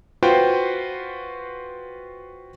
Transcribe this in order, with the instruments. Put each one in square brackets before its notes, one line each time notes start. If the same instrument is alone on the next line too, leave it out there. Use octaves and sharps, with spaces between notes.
[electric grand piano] F4 F#4 B4 C5 G5